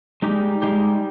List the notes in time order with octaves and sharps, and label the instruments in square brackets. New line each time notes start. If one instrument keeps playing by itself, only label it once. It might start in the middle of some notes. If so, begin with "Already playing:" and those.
[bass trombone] G3 [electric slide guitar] G#3 D#4 G4
[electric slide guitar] G#3 D#4 G4